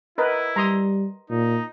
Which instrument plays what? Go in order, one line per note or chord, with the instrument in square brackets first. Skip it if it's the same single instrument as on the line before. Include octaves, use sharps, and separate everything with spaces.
[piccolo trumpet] E4 [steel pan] A#4 B4 D#5
[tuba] G3 [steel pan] A#5 C6 D#6
[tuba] A#2 [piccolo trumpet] D#4